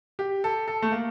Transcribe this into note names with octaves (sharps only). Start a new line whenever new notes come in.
G4
A4
A4
A3
A#3